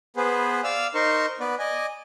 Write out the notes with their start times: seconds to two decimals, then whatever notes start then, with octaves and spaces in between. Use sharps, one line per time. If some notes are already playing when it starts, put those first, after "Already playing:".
0.17 B3 G#4 B4 C5
0.64 D5 F5 E6 F6
0.95 D#4 A#4 C5 C6 C#6
1.40 B3 B4 D5
1.59 D5 D#5 G#5